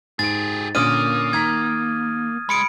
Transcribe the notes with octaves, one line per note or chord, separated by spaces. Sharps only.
G#2 G4 G#4 A6 D7
A#2 D3 A#3 C#4 D#6 F6 D#7
D#3 A#5 G#6 B6
C#2 G#3 B5 C#7 D7